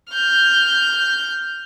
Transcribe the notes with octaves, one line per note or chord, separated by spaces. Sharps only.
F6 G6